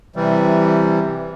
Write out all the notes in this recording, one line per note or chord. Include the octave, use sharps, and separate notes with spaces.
C3 E3 G3